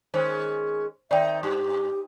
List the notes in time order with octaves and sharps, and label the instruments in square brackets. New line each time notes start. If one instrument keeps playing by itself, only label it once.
[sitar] D#3 G#3 C#4 [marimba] C5
[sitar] D#3 C4 D#4 [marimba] D5 G5 [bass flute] E5
[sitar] G2 [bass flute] G4